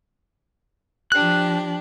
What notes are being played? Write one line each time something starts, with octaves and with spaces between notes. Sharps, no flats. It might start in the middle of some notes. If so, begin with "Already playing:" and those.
F3 D4 G4 F#6